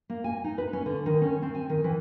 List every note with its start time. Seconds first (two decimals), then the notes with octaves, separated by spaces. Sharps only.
0.10 A#3
0.24 G#5
0.44 D#4
0.58 B4
0.73 C#4
0.86 D3
1.06 D#3
1.22 C#4
1.42 C4
1.55 G#5
1.69 D#3
1.84 E3